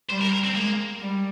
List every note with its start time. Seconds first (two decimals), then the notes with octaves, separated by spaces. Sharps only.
0.10 G3 C5
0.22 A#4
0.29 C5
0.33 A#4
0.44 C4
0.55 G#3 A#3
1.00 G3